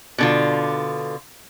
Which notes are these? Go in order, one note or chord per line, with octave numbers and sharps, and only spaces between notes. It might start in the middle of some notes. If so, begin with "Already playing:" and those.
B2 D3 F4